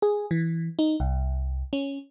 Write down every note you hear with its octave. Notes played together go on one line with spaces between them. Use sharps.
G#4
E3
D#4
C2
C#4